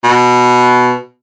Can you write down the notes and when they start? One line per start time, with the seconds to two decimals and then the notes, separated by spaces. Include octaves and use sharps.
0.04 B2